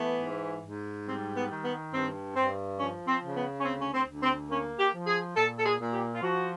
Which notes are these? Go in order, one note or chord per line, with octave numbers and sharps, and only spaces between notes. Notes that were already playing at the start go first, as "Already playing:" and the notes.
Already playing: E3 A3 B3
G#2
G#2
G3 C4
B3
D#3
B3
G2 C4
G2 C4
F3 C#4
C4
C#3
B3
C#4
D2 C4
C#4
C4
D2
C4
A#3 C#4
G4
F3
G#4
A#2 A4
A4
G#4
A#2
G4
F4
F3 F#4